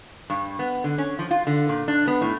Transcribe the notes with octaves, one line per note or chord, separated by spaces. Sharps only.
G2
B3
D3
C#4
F3
F4
D3
A#2
D4
B3
A2